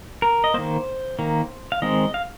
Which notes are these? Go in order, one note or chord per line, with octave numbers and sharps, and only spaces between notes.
A#4
D#5
D#3 A#3 C5
D#3 A#3
F5
D#3 G#3 C4 D#5
F5